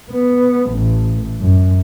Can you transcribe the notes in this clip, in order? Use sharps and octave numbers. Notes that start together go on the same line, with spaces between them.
B3
A1
F#2